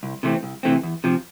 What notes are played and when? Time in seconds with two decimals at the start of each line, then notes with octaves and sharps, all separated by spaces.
0.03 C2
0.23 C3 E3 A3 C4
0.43 C2
0.63 C3 E3 A3 C4
0.83 E2
1.04 C3 F3